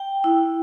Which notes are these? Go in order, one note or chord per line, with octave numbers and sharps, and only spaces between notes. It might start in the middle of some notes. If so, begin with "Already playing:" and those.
Already playing: G5
E4